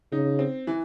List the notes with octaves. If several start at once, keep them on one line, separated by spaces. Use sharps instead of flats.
C#3 D#4
C4
E3